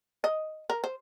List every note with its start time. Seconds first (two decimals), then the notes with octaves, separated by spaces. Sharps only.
0.24 D#5
0.70 A#4
0.84 C5